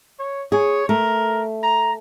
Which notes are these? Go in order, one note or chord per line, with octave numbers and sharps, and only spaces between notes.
C#5
G#4 C#5
A3 A#4
A#5